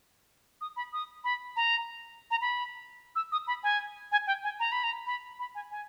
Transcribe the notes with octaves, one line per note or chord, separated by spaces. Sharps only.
D#6
B5
D#6
B5
A#5
A#5
B5
E6
D#6
B5
G#5
G#5
G5
G#5
A#5
B5
A#5
B5
B5
G#5
G#5